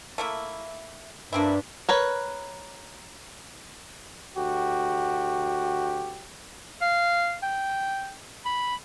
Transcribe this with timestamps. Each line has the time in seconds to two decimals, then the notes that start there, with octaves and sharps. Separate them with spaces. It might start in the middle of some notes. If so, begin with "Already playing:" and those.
0.18 A3 A#3 E4
1.33 G2 A#3 C4 D4 E4
1.89 A#4 B4 C#5
4.36 D2 F#4 G4
6.82 F5
7.43 G5
8.45 B5